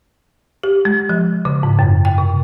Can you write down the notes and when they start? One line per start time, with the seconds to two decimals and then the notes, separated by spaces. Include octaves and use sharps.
0.63 G4
0.85 G#3
1.09 F3
1.45 C#3
1.63 G#2
1.79 F#2
2.05 G5
2.18 C3